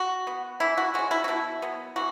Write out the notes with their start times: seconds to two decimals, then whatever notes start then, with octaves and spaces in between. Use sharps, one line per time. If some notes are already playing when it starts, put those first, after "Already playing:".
Already playing: F#4
0.27 B3
0.60 E3 E4
0.77 F#4
0.94 G#3 C#4 F#4
1.11 E4
1.24 F#4
1.28 B2 E4
1.62 F#3 B3
1.96 E3 F#4